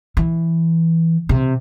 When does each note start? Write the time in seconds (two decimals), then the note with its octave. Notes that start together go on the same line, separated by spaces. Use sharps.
0.17 E3
1.29 C3